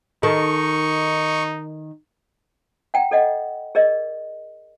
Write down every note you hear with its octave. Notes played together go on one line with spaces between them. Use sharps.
D#3 D#4 A4 C#6
F#5 G5 A#5
A4 D5 D#5 F#5
G#4 A#4 D5 D#5